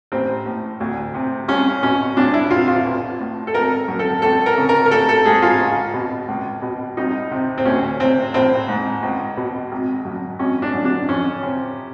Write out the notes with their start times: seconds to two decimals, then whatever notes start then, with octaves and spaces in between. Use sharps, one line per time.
0.12 A1 C4
0.46 A2
0.80 D2
1.14 C3
1.48 C2 C#4
1.83 B2 C#4
2.17 C2 D4
2.34 E4
2.51 C3 F4
2.68 F4
2.85 B1
3.20 A2
3.47 A4
3.54 G#1 A#4
3.88 F#2
3.99 A4
4.22 C#2 A4
4.46 A#4
4.58 C#3
4.69 A#4
4.86 A#4
4.91 A1 A4
5.09 A4
5.25 G#2 G#4
5.42 F4
5.60 C#2
5.94 B2
6.28 C#2
6.62 B2
6.97 C2 D#4
7.31 C3
7.58 C4
7.65 D2 C#4
8.00 C3 C4
8.34 A#1 C4
8.68 G#2
9.03 C#2
9.37 B2
9.72 G#1
10.05 F#2
10.39 G#1 C#4
10.62 D4
10.74 F#2
10.85 D4
11.08 F2 C#4
11.43 C3